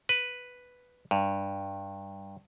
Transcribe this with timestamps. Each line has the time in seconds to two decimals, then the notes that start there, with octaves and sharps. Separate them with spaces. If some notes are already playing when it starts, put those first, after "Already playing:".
0.09 B4
1.11 G2